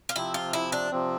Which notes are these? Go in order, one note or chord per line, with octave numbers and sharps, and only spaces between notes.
F4
C3 F3 C4 E4
F4
E4
D4
C3 F3 C4